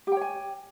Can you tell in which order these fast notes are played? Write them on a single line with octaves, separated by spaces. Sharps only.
G4 G5 C#5 G#5